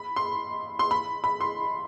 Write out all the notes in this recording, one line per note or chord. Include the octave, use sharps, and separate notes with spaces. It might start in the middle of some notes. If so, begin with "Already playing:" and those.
Already playing: B5
C6
C6
B5
B5
C6